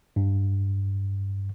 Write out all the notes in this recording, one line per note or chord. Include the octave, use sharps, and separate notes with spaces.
G2